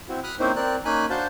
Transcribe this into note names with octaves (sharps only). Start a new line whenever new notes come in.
C4 E4 F#4
B5 D#6 F6 F#6
A#3 C4 C#4 D#4 E4 C5
C4 A#4 D5 F#6
A#3 C#4 D#4 G#5 B5 F#6
D4 F#4 C5 F5 A5 G6